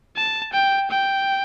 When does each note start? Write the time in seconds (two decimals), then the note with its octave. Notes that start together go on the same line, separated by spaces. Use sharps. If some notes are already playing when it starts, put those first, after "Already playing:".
0.16 A5
0.53 G5
0.90 G5